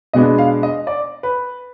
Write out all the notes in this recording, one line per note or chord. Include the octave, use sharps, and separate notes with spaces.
B2 G#3 B3 D4 D#5
F5
D#5
D5
B4